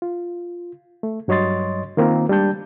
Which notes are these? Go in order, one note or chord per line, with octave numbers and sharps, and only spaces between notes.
F4
A3
G2 F#3 C#5 D#5 C6 A6
D#3 A#3 C4 F4 A#4
G3 G#3 D4 A5 G6